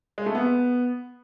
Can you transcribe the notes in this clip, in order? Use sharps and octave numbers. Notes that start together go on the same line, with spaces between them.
G#3
A3
B3